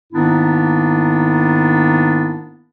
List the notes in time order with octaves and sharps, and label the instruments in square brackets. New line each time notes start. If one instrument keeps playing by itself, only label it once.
[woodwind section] G#2 D#3 A#3 B3 D4 E4